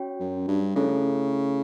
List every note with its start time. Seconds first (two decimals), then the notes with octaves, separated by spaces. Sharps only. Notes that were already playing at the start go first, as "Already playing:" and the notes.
Already playing: C#4 F#4 C#5 G5
0.20 F#2
0.48 G2
0.76 C#3 A3 E4 A4 C#5